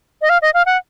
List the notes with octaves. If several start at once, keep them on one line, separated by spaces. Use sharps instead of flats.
D#5
F5
D#5
F5
F#5